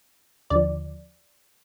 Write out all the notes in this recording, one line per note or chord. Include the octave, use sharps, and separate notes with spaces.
D#2 D3 F3 D5